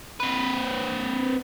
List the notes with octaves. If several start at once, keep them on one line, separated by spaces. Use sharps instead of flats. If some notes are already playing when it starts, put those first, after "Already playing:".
C4 B4